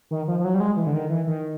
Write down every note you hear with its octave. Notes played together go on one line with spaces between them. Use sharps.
D#3
F3
F3
F#3
G3
G#3
E3
D3
D#3
E3
D#3